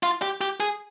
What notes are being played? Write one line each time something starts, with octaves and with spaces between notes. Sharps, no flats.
F4
G4
G4
G#4